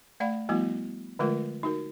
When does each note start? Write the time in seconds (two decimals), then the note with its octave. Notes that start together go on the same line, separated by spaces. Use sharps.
0.20 A3 D5 F5 B5
0.49 F3 G3 A3 B3 E4 F#4
1.19 D3 F3 G#3 A3 F4 A#4
1.63 D#4 F#4 A#4